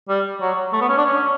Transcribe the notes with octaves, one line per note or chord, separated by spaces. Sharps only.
G3
F#3
A3
B3
C#4
D4
C#4